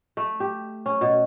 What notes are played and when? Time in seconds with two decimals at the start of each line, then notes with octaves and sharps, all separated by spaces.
0.17 A3
0.40 G4
0.86 C#4
1.01 B2